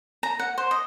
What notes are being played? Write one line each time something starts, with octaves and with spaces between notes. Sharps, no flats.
A#5
F#5
C5
D#5